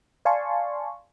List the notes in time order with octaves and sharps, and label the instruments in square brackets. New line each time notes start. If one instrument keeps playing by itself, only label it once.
[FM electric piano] D5 F5 G#5 A5 C6 C#6